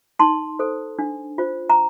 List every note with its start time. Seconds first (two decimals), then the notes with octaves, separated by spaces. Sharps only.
0.19 D#4 A5 C6
0.59 A4 C5
0.99 D4
1.38 F4 C5
1.70 A#5